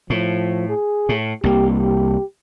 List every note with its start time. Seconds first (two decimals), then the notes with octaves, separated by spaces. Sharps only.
0.10 A2 F3
0.69 G#4
1.09 A2
1.44 C2 A#3 G4
1.79 G4